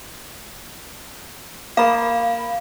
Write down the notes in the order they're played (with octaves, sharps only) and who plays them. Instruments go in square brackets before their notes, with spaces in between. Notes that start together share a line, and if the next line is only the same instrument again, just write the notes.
[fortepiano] A#3 [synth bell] F5 B5